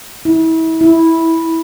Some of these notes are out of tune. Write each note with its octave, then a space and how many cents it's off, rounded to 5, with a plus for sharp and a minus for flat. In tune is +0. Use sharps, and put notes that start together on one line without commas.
E4 -30
E4 -10